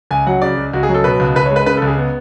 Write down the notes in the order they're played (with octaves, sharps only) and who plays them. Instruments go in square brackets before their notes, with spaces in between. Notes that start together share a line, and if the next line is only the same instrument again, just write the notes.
[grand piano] C#2 G#5
F#3 F#5
C#3 D5
C#2
C#2 F#4
G#4
F#3
A4
B2 B4
C#2
C#2 B4
C#5
G#3
B4
C#3 B4
A4
C#2
G#4
B3